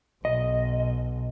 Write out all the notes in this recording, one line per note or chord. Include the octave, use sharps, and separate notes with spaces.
B1 D#5